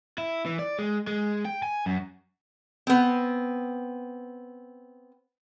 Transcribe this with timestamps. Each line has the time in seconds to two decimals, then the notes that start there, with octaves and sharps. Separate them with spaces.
0.18 E4
0.46 E3
0.59 D5
0.78 G#3
1.07 G#3
1.45 G5
1.63 G#5
1.86 F#2
2.87 B3 C4